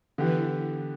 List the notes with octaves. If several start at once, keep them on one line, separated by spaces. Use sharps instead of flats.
D3 E3 B3 G4